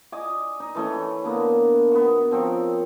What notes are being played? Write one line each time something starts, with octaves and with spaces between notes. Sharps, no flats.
D5 D#5 G#5 D6
D#4
E3 A3 C#4
D3 A#3 B3
B3 F#4
F3 C4 A#4 C#5